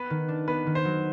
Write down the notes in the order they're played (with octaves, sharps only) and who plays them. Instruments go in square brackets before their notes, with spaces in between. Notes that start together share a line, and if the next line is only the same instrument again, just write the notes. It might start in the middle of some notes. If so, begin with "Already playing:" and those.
Already playing: [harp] B3 [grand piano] B4
[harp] D#3
D4
[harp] B3 [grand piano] B4
[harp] D#3
[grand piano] C5
[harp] F#3